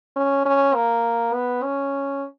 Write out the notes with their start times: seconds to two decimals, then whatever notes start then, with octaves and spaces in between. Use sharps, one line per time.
0.16 C#4
0.45 C#4
0.75 A#3
1.34 B3
1.63 C#4